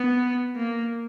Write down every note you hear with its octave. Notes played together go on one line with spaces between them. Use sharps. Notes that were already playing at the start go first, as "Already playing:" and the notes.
Already playing: B3
A#3